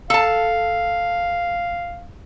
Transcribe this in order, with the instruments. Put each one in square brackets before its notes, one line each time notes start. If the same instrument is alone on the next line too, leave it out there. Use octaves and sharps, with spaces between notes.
[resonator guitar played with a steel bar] A4 A5 [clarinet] F5